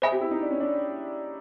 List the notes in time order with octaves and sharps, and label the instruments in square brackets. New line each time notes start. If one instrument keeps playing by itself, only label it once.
[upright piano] G#4 [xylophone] C5 E5 G#5 B5
[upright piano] G4
E4
D#4
D4
C#4
D4